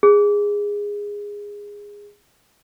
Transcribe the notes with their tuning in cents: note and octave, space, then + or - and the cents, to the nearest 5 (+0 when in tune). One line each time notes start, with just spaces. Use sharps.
G#4 -15